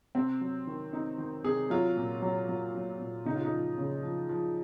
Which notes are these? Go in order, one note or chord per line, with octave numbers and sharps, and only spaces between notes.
C3 C4
F#3
D#3
C3 D#4
D#3
C3 G#4
F#3 F4
A#2
F#3
F#3
F#3
A#2
C#3 D#4
F4
D#4
F3
C#3
F3
F3